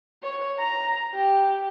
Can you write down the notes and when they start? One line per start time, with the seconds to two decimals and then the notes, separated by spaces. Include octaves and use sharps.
0.23 C#5
0.58 A#5
1.14 G4